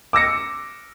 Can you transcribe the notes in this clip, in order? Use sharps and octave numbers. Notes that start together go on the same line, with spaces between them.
D6 E6 A#6 C#7